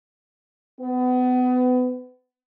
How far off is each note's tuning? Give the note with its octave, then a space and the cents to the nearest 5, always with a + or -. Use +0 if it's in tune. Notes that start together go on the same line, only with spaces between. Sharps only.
B3 +30